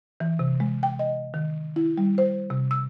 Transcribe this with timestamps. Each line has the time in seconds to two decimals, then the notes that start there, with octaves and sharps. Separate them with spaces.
0.20 E3
0.39 C3
0.60 G#3
0.83 G5
0.99 D#5
1.34 D#3
1.76 E4
1.98 G3
2.18 C5
2.50 C3
2.71 E6